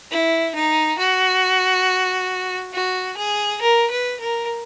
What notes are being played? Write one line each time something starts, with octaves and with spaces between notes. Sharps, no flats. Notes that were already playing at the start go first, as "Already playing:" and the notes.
E4
D#4
F#4
F#4
G#4
A#4
B4
A#4